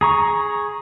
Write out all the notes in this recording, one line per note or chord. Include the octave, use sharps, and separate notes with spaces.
G#4 A#5 C#6